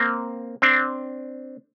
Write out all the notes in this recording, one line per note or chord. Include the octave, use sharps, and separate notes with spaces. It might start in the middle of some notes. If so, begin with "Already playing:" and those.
Already playing: A#3 C4
C4 D4